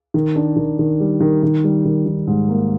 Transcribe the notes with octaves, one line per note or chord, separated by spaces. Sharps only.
D#3
D4
D#3
D#3
G3
D#3
D#3
G3
D#3
D#3
G#2
A#3